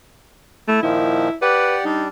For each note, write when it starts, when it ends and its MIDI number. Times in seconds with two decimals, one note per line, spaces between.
0.68 0.82 57
0.68 0.82 64
0.83 1.29 46
0.83 1.29 51
0.83 1.29 53
0.83 1.35 64
1.42 1.84 67
1.42 1.76 71
1.42 1.84 74
1.42 1.84 78
1.85 2.08 55
1.85 2.08 62
1.85 2.04 63